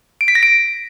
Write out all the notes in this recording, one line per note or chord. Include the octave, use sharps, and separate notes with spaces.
D7
B6
A#6
D7